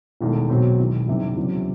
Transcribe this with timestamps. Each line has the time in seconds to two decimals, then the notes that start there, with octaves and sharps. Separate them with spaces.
0.21 E1 E2 D#3 A3
0.50 B1 B2 F#3 C4
0.79 E1 E2 D#3
1.08 F#1 E2 C3 D#3 G3
1.37 F#1 E2 C3 F#3 C4